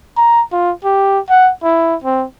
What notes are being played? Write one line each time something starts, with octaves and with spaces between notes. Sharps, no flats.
A#5
F4
G4
F#5
E4
C4